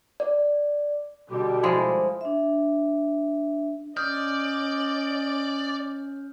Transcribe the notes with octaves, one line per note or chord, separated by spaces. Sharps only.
D5
B2 D3 G3 G4
F3 G#3 E4
D4 E5
C#4 D5 D#5 D#6 F6 G6